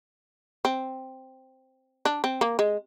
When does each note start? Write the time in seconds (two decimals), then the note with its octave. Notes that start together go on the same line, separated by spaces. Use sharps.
0.65 C4
2.05 D4
2.24 C4
2.41 A#3
2.59 G#3